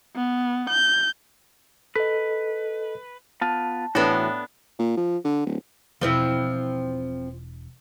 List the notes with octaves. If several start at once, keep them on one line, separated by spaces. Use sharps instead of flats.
B3
G6
A4 B4 D#5
B3 F4 A5
A2 E3 B3 D4 F#4 A4
A#2
F3
D3
D1
E1 F3 C4 E4